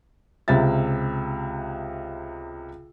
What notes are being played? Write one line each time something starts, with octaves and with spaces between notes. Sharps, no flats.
C#2 C3 E5 A6